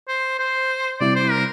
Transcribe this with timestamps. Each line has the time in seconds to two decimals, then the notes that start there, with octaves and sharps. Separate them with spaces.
0.08 C5
0.39 C5
1.00 C3 G3 C4 E4 D5
1.16 C5
1.31 A#4